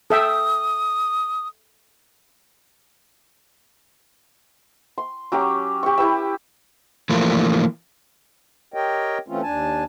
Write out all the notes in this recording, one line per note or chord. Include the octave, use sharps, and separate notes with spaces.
A4 E5 G5 D#6
C6
F#3 C#4 G4 D6
G4 C#6
E4 G4 B4 E6
E3 F3 A3 A#3
G4 A#4 C#5 D#5 G5
E3 A3 C4 C#4 F4
D#2 D4 G#5 A5